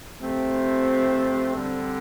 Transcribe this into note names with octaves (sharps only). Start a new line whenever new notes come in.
C3 F3 A3 C4
D3 G3 C4